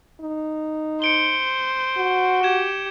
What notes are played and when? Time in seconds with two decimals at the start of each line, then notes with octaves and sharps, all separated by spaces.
0.21 D#4
1.02 C5 C#7 D7 G7
1.97 F#4
2.43 G4 G#6 E7